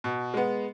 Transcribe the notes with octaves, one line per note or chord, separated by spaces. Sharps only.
B2
G#3 B3